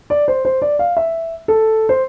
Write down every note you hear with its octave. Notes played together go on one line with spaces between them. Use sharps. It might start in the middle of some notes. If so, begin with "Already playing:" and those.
D5
C5
C5
D5
F5
E5
A4
C5